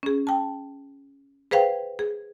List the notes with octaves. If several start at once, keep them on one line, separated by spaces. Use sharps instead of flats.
C#4 G#4
G5 A5
G#4 B4 C5 F5 G5
G#4